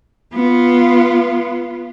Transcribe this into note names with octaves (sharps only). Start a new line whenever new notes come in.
B3 F4